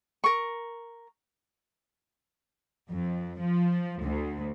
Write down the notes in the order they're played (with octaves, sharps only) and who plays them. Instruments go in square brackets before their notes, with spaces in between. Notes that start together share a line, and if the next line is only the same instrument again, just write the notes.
[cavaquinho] A#4 C#6
[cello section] F2
F3
D2